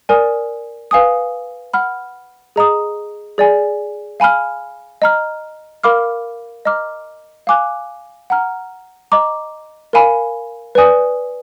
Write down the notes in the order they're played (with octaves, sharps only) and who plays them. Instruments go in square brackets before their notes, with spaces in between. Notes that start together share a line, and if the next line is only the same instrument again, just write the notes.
[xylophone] A#4 D5 G#5 D#6
B4 F5 G#5 D#6
F#5 B5 F6
G#4 D#5 A#5 D#6
G#4 D5 G#5
F5 G#5 B5 F6
D#5 A#5 F6
A#4 F5 B5 D6 F6
D#5 A#5 D6 F6
F5 G#5 D6 F#6
F#5 A#5 F6
D#5 A#5 D6
A#4 F5 G#5 B5
B4 D5 G#5 D#6